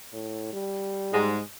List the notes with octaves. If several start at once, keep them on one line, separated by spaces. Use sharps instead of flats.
A2
G3
G#2 G#3